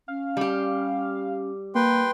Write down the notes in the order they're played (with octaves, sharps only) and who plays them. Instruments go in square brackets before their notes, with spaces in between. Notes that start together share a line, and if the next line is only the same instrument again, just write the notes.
[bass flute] C#4 [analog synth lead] F5
[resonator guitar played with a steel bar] G3 G4
[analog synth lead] A#3 [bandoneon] B4 G5 C6